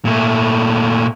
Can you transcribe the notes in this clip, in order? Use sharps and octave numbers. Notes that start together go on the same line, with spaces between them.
A#2 A3